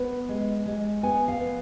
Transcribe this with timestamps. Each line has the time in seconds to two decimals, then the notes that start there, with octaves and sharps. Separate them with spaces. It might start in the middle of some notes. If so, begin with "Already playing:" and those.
Already playing: B3
0.29 G#3
0.66 G#3
1.03 B3 G#5
1.28 F5
1.40 B3